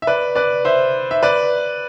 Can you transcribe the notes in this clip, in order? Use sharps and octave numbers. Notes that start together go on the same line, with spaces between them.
E5
B4 D5
B4 D5
C5 E5
E5
B4 D5